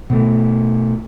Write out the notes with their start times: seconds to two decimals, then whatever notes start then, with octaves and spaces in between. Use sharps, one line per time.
0.10 B2 A3